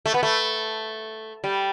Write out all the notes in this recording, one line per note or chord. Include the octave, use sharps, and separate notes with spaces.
A3
B3
A3
G3